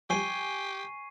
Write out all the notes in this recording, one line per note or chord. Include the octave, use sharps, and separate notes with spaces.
F3 G3 G4 G#5 C#6 C7 D#7